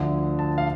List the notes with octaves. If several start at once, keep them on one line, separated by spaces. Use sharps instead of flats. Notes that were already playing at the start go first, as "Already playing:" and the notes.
Already playing: D2 D3 F3
A5
F5